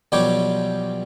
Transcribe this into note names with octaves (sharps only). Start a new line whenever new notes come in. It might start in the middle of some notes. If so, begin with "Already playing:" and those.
B1 F3 G3 G4 C#5 D6